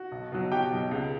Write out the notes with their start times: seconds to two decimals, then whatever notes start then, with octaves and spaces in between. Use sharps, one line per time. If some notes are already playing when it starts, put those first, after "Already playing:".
Already playing: F#4
0.12 B1
0.32 B2 F#3
0.51 B1 G4 G5
0.72 B2 F#3
0.91 C#2